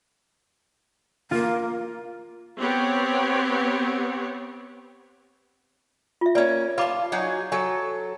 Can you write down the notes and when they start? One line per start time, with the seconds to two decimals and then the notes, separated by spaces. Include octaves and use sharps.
1.31 A#3 F4
2.60 B3 C4 G4 C#5
6.21 F4 E5
6.35 A#3 C#4 B4 D5
6.78 F4 B4 A5 B5 D6
7.12 F#3 D#4 G#4
7.52 F#3 A4 G#5